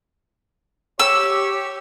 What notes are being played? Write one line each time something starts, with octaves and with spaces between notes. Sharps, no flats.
G4 C#5 E6